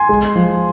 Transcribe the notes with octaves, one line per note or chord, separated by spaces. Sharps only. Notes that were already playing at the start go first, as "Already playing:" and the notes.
Already playing: G#5 C6
G#3
F3